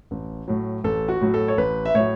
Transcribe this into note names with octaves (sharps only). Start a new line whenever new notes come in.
A1
A2 F#3
A1 A4
F#4
A2 F#3
A4
C#5
A1 B4
E5
A2 F#3 C#5